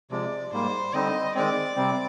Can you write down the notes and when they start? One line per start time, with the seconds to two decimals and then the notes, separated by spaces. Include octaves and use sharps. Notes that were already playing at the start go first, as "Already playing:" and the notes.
0.11 C3 F3 G#3 D5
0.52 G#2 G3 A#3 C5
0.94 D3 G3 C4 D#4 D#5
1.35 D#3 G#3 C4 D5
1.76 C3 G3 C4